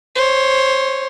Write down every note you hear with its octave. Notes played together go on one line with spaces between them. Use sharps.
C5 C#5